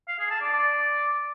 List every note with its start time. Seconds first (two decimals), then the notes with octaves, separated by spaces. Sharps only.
0.08 F5
0.19 G#4
0.30 A5
0.41 D5
0.53 D5